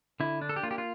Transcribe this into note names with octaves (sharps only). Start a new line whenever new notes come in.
D3 E4
D4
A4
G4
A#3 F4
G4
F4